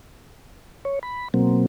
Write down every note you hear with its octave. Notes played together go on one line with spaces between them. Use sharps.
C#5
B5
B2 F#3 A#3 C4